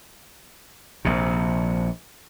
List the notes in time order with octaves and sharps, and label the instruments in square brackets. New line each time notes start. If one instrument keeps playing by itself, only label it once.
[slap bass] A#1 C3